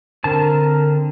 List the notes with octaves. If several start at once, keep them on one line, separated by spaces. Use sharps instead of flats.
D3 C4 A#4 A5